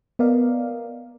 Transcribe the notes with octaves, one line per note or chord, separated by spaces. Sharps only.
B3 A#4 D5 D#5 F5